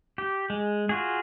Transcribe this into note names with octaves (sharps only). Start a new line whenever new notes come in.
G4
G#3
F4 F#4 G#4